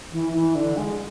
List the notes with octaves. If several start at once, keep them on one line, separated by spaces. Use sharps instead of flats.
E3
E3
D3
G#3